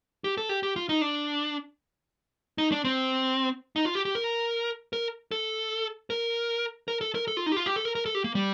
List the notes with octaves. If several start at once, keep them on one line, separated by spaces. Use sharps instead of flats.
G4
A4
G4
G4
F4
D#4
D4
D#4
D4
C4
D#4
F4
G4
G4
A#4
A#4
A4
A#4
A#4
A4
A#4
A4
F4
D#4
G4
F4
G4
A4
A#4
A#4
A4
G4
A#3
G3